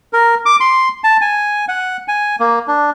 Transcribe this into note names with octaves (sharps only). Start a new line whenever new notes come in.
A#4
D6
C6
A5
G#5
F#5
G#5
A#3
D4